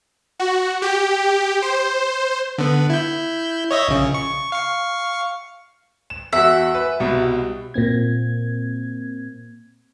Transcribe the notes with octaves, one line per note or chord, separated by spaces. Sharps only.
F#4
G4
C5
D3 B3
E4 G6
C#5 D#5 E5
A#1 C#3
C#6
F5 C#6
E7
E2 F#4 E5
B4
C2 B2
A#2 A#3 C4 G#6